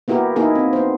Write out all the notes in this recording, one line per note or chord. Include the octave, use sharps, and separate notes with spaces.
A#3 B3 E4 F#4 G4 A#4
A#3 D#4 E4 G#4 A#4
C4
B3 C5